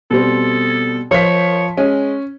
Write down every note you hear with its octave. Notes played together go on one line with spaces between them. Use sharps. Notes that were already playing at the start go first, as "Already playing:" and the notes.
B2 G3 C4 A4
F3 F4 C#5 B6
G#3 C#4